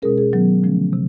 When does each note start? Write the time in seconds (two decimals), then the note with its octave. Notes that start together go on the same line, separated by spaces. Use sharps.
0.02 B2 G#3 C#4 G#4 A#4
0.17 G#4 A#4
0.33 D#3 F#3 B3
0.63 D3 F3 A3 C#4
0.93 C3